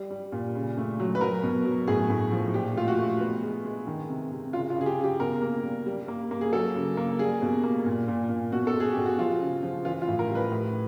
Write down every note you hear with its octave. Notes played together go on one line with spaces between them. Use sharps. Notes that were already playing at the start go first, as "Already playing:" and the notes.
Already playing: G3
G3
A#2
C#3
A3
F#3
B4
F#3 A#4
B2
F#3
A2 G#4
A2
F3
A#2 G4
A3 F4
F#4
A3
B3
G#3
G#3
D#3
C3
C3
C#3 F4
F4
C#3 G#4
G4
C#3
G4
B2 A#4
A#3
G3
G3
A#3
A#3
G#4
F#3 A4
C#3
A#3
G3 G#4
B2
A#3
A#2
A#2
A#2
B2 F#4
A4
G#3
G#4
B2 G4
F#4
F3 F4
C#3
F3
E3 F4
F4
A2
A#4
G3
B4
A2